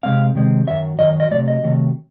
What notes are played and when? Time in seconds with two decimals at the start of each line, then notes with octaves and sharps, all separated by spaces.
0.03 C3 D#3 G#3 C4 F5
0.35 C3 D#3 G#3 C4
0.67 F#2 D#3 F#3 E5
0.99 F#2 D#3 F#3 D#5
1.20 D#5
1.31 C3 D#3 F#3 A3 D5
1.48 D#5
1.63 C3 D#3 F#3 A3